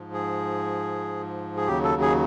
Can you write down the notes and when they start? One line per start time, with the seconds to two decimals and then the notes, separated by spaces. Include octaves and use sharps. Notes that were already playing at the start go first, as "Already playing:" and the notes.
Already playing: G#2 F3
0.13 G#4
1.57 G#4
1.67 D#2 C#3 F#3 G4
1.84 A4
2.02 G#4